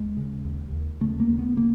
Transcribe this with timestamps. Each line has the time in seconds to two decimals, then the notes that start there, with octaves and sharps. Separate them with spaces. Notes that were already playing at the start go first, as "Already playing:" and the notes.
Already playing: D#2 G#3
0.17 C#3
0.45 D#2
0.73 D#2
1.01 C#3 A3
1.20 A#3
1.29 D#2
1.39 B3
1.57 C#3 A#3